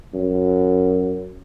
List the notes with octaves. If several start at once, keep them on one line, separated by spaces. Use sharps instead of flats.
F#2